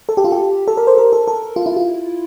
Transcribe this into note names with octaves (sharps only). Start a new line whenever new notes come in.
A4
G4
F4
G4
A4
A#4
C5
A#4
A4
A4
F4
E4
F4